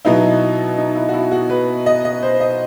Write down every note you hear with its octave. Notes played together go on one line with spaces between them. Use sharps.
B2 F#3 B3 D#4 E4
D#4
E4
F#4
E4
F#4
B4
D#5
D#5
C5
D#5